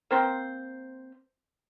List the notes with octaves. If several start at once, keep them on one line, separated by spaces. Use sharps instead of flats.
A#3 C4 C5